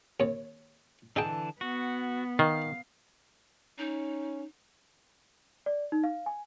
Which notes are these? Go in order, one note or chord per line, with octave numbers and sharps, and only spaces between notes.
D#2 C#5
D3 E3 D#4 G#4 G5 A5
B3 F#4
D#3 F5
C#4 D#4
D5
D#4
F5
G#5